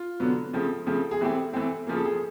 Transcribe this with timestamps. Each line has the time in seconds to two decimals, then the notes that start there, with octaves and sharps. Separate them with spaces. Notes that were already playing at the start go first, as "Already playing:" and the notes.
Already playing: F4
0.20 D3 F#3 B3
0.53 C#3 F3 A3 C4
0.86 C#3 F3 A3 C4
1.11 G#4
1.20 E3 A3 C4 G4
1.53 E3 A3 C4
1.87 C#3 F3 A#3
1.97 A4
2.05 G#4